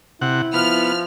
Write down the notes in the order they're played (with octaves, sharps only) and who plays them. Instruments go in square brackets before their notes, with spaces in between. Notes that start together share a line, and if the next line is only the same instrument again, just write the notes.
[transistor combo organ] C3 F#5 [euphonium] E4
[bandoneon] F3 [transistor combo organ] B3 [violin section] F6